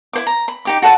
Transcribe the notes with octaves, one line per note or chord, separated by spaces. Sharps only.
E4 C5 D6
A#5
B5
D#4 G4 D6
F#4 A4 F#5 A5